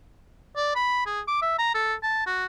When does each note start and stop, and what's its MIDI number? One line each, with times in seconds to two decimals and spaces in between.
0.56 0.71 74
0.75 1.04 83
1.06 1.20 68
1.28 1.37 86
1.42 1.55 76
1.59 1.70 82
1.75 1.94 69
2.03 2.25 81
2.26 2.46 66